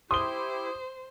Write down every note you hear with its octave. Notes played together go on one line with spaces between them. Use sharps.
E4 G4 C5 C6 D#6 G7